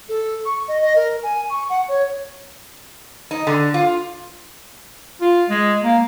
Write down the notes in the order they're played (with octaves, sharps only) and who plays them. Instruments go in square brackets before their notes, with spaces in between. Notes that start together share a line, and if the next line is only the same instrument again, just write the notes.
[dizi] A4
C#6
D#5
D#5
A#4
G#5
C#6
F#5
C#5
[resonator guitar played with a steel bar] D#4
D3
F4
[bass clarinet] F4
G#3
A#3